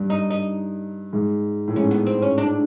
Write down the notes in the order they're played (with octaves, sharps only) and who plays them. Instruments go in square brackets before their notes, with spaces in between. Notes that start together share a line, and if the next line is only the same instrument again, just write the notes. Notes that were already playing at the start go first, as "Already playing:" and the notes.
Already playing: [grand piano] G2
[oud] D#4
D#4
[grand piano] G#2
A2
[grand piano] G#2 [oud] C#4
[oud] B3
C4
C#4
D4